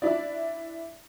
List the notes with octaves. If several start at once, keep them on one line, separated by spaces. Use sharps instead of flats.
D4 E4 D5